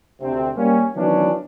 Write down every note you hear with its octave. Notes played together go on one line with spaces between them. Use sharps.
D2 C3 C4
G3 A#3 C#4
D#3 E3 F#3 B3 C#4 D4